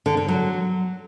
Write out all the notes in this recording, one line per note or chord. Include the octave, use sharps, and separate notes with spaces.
D3
D3
F#3